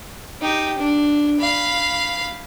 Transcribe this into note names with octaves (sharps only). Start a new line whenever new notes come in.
D#4 G4
D4
F5 B5